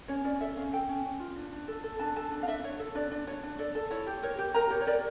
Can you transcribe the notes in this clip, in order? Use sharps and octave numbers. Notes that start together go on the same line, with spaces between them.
C#4 C#5
C#4 D5
A4 E5
C#4 F5
A4 G5
C#4
C#4
F4
D4
D4
A4
A4
D4 A5
A4 A5
D4
F5
D4 E5
D4 C#5
A4
D4 D5
D4
D4 C#5
D4
A4 D5
A4
E4 C#5
G4
A#4 C#5
G4
A#4 A#5
G4 C#5
C#5
A#4 D5